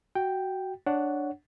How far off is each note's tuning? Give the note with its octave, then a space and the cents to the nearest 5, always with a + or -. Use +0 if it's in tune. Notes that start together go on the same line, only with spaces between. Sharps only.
F#4 +15 G5 +0
D4 +0 C#5 +10 F#5 +0